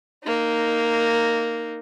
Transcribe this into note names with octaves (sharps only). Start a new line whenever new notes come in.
A#3 D#4